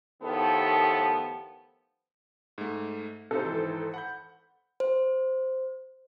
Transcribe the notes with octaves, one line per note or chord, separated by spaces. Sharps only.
A2 D#3 F3 B3 G4 A4
G#2 A3
C3 D#4 F#4 A4 C5
G#1 E3 D#4
F#5 B5 G6
C5